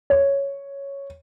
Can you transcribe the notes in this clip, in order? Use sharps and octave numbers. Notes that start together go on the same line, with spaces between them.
C#5